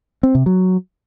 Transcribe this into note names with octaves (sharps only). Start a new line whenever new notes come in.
C4
C3
F#3